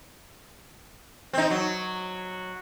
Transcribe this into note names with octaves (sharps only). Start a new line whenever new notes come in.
C4 D#4
F#3